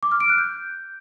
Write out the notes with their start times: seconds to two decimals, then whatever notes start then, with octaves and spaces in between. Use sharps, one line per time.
0.03 D6
0.12 F6
0.20 D7
0.29 F#6
0.38 G6